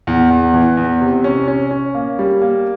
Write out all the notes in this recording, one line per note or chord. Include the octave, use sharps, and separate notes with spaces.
E2
E2
E3
E2
C3
C#4
C#4
C#4
A#3
G3
A#3